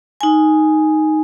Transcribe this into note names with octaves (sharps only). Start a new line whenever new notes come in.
D#4 G#5